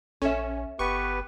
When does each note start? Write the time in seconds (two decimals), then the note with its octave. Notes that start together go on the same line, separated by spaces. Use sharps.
0.22 A#1 C#4 A4 E5
0.79 G1 B3 G4 B4 C#6